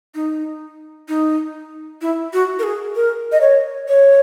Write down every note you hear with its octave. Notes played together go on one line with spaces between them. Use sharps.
D#4
D#4
E4
F#4
A#4
G#4
A#4
D#5
C#5
C#5